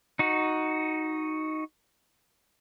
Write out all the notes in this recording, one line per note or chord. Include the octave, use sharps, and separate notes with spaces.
D#4 F#4